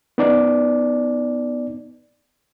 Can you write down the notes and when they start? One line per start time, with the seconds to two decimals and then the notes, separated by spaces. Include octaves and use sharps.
0.18 B3 D#4 D5